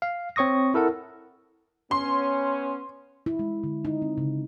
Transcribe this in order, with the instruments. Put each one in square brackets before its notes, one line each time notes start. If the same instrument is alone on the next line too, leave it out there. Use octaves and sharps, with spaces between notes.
[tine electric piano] F5
C4 C#5 C#6 D#6 A#6
E4 A4 A#4 F#5
[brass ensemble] B3 C#4 [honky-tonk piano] C6
[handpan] E4
G#3
D3
D#4
C4
C#3